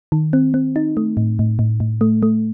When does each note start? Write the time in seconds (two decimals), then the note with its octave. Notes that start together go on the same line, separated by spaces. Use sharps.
0.12 D#3
0.33 C4
0.54 C4
0.76 D#4
0.97 A3
1.17 A2
1.39 A2
1.59 A2
1.80 A2
2.01 A3
2.23 A3